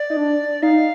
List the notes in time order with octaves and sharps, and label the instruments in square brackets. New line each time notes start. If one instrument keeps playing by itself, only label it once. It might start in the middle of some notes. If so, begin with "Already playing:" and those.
Already playing: [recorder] D5
[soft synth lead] D#4
D4
[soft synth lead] D#4 [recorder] F5